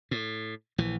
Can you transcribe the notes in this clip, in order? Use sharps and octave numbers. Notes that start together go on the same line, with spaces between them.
A2
A#1 E3